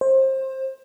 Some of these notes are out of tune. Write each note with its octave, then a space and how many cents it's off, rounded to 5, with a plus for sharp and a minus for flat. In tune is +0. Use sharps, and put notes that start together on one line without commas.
C5 +25